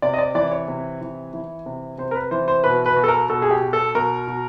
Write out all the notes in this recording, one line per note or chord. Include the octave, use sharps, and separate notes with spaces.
C3 D5
D#5
D5
E3 D5
C#5
C3
E3
E3
C3
C3 C5
A#4
B4
E3 C5
C5
B2 B4
B4
B2
A4
A#4
B2 A4
G#4
G4
B2
A4
B2 A#4
B2